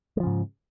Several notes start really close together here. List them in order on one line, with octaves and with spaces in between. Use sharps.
G#3 F3 C#3 G#2